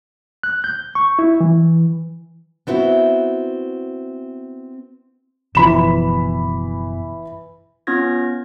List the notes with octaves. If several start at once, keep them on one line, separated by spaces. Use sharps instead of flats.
F#6
G6
C#6
E4
E3
B3 C4 E4 F#4
F#1 B2 E3 F3 B5 E7
B3 C#4 F4 F6 G#6 A#6